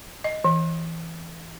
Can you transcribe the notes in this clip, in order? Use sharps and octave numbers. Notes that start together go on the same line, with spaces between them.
D#5
E3